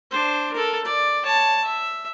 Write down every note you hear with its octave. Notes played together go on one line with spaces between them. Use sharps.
D4 C5
A4 A#4
D5
C#5 A5
E5